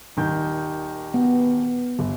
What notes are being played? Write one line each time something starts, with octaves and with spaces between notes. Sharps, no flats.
D#1 D#3 G6
B3
G1